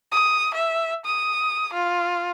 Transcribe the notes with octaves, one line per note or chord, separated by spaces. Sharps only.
D#6
E5
D#6
F4